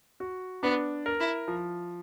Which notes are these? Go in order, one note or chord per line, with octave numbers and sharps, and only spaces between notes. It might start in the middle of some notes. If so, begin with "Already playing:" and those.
F#4
B3 D4
A#4
E4
F3